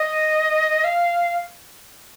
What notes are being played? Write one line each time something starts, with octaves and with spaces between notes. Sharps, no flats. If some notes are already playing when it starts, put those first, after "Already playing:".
Already playing: D#5
F5